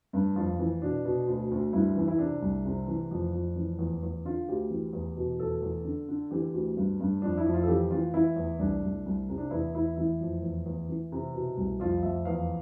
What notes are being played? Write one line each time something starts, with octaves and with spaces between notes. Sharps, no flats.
G2
F2 F4
E3
B2 D4
B2
D2
D2
G2 E4
E3
E4
C3 D4
C2
C3
E3
F2
F2
E3
E2
E2
D3 F4
D2 G4
E3
E2
B2
E2 A4
E2
D3
D3
E3 G4
D2
G2
G2
F2 D4
E4
F2
F4
A4
E3 G4
E3 F4
E3 E4
E2
C2 D4
C2
C2
C3
D4
E2 E4
E2 E4
E3 E4
F2
E2
E2
E3
C3
B2
C2
F2 F4
F2 E5
E2 F5